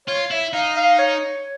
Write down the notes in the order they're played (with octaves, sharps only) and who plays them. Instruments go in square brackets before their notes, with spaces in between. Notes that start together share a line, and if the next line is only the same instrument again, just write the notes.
[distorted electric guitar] F4 [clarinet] C#5
[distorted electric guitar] E4 [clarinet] E5
[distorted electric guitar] D#4 [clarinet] F5
[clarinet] F5
C#5